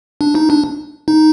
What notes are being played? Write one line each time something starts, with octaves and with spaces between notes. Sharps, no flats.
D4
D#4
D4
D#4